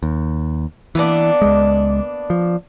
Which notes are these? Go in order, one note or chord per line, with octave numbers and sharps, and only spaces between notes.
D#2
E3 A#3 B3 D4
C#2 G#3
F3